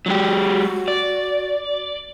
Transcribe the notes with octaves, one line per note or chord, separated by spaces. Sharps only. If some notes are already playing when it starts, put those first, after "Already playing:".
F#3 G#3 F#4 G4
D5